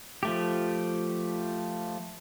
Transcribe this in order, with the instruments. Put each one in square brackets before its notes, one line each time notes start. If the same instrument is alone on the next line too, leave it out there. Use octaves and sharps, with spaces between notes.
[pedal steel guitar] F3 A3 G4